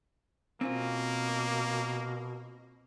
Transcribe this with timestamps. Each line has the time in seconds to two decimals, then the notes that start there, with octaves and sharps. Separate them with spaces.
0.61 B2 A#3 C4 C#4 F4